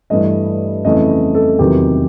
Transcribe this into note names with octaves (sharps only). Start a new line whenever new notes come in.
G2 E3 A3 D#5
F2 C#3 E3 A3 D#5
A4
E2 C3 D#3 F#3 G4